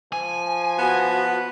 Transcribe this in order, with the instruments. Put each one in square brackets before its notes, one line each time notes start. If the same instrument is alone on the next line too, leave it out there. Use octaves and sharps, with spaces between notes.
[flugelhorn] F3 [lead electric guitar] G#5
[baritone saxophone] B3 [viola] F#4